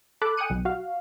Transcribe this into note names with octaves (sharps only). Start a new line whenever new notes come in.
A4 B5 D6 F#6
G5 G#5 D#6 F#6 C#7 D#7
B1
F#4 F5